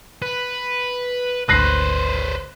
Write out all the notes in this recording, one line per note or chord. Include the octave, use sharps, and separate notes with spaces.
B4
G#1 D2 B4 C5 F#6 A#6 C7